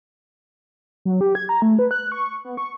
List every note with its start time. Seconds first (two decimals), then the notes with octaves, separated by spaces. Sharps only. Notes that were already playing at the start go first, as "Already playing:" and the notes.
1.05 F#3
1.21 G4
1.35 G#6
1.49 A#5
1.62 A3
1.79 B4
1.91 F#6
2.12 C#6
2.45 B3
2.57 C#6